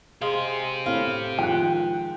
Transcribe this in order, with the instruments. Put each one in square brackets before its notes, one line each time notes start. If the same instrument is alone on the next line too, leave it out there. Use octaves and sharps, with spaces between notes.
[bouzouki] G#3 F5 [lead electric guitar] G4 C5
[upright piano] A2 C4 E4 [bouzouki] F5
[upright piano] D#3 F3 G#3 [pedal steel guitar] G5 F#6